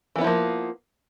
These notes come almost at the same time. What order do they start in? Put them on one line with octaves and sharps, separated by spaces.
E3 B3 E4 F3 A#3